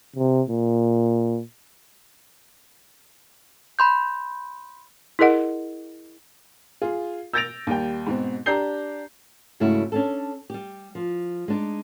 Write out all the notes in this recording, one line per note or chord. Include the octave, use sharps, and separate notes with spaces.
C3
A#2
B5 C6 G6
E4 G#4 A#4 D#5 F#5
F4 G#4
E6 G6 A6 A#6 D7 F7
D#2 G3 G5
G#2 B2 C4
D4 G4 A#5 G6 C7 G7
G#2 C#3 A3 C#4 E4 F#4
C#4 D4 A4
G3 G4
F3
G#3 D4 D#4